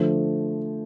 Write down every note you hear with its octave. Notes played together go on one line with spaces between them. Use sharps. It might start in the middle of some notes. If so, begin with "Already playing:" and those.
Already playing: D3 F3 A3